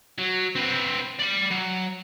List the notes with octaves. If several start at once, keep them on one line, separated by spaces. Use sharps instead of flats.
F#3
C4 B4
D5 B5
F#3